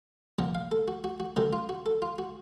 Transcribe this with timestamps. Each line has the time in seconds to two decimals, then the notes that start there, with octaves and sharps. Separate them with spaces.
0.39 C2 A#2 F3 F#5
0.55 F5
0.71 A4
0.88 F#4
1.04 F#4
1.20 F#4
1.36 C#2 C3 D#3 F#3 A4
1.53 F4
1.69 F#4
1.86 A4
2.02 F4
2.18 F#4